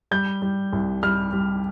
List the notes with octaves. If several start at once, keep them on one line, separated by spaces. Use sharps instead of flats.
G3 G6
G3
C2
G3 F6
G3